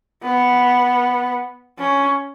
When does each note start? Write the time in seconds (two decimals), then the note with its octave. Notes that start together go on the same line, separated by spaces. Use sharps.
0.23 B3
1.78 C#4